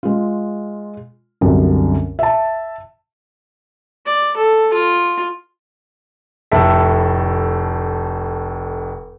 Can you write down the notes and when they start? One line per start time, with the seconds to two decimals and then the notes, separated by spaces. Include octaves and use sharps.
0.03 G#3 F4
1.41 C2 F#2 D3
2.19 E5 A5
4.06 D5
4.37 A4
4.73 F4
6.52 F1 A2 A4 E5